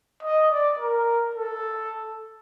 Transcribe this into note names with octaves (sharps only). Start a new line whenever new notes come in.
D#5
D5
A#4
A4